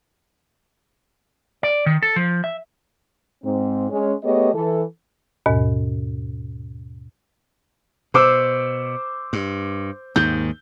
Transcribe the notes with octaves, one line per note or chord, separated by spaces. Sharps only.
D5
D#3
A4
F3
E5
G#2 C4
G#3 C#4
A3 B3 G4 G#4 C#5 D#5
E3 A4
D#2 G#2 B2
B2 C5 D6 E6
G2
D#2 G#2 D#3 G6